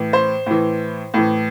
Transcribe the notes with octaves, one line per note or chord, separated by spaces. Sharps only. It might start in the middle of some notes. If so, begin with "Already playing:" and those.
Already playing: A2 E3
C5
A2 E3
A2 E3